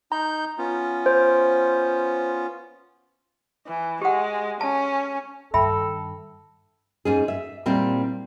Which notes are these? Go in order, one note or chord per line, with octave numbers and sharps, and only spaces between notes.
D#4 A#5 G6
B3 C#4 F4
C5
E3
G#3 G4 F#5
C#4 A5
G2 D#3 A4 E5 G5 B5
G#2 C#4 G#4
E5
A#2 G3 C4 E4